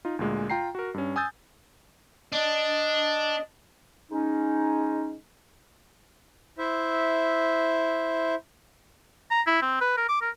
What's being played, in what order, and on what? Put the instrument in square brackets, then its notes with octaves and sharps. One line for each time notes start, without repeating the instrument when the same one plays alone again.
[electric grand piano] D#4 F4
D2 A#2 G#3
F4 G5 A#5 C7
F#4 A#4
G2 C#4
G#5 D#6 E6 G6 A6
[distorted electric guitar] D4 [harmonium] D#5
[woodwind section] G#3 C#4 D#4
[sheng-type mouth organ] E4 C5 E5
[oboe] A#5
E4
C4
B4
A#4
D6
A#4